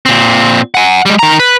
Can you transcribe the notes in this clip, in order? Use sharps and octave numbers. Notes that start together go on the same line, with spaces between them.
A#2 C4
F#5 G#5
G3 G#3
D#3 A#5
B4